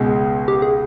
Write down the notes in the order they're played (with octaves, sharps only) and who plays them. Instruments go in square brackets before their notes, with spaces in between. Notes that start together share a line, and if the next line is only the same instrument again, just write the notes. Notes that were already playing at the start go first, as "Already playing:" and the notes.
Already playing: [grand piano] C#2 B2 G#3
[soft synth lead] G4
G#4